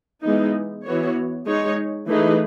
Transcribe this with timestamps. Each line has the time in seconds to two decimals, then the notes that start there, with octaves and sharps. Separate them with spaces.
0.23 E3 G#3 B3 D#4
0.86 E3 B3 F#4 C#5
1.47 G#3 D#4 G#4 C#5
2.08 E3 A3 D#4 G#4 B4